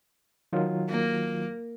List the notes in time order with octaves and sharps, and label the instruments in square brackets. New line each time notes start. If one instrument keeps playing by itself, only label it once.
[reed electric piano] D#3 F#3 F4
[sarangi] A#3